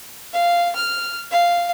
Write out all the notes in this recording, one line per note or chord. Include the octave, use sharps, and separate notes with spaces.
F5
F6
F5